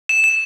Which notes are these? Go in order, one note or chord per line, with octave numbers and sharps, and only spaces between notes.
E7
E7